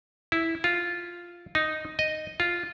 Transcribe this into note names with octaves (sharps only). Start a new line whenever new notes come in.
E4
F4
D#4
D#5
F4